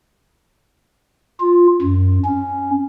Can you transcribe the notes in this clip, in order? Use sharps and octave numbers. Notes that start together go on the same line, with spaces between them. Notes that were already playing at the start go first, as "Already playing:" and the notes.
F4
F#2
C#4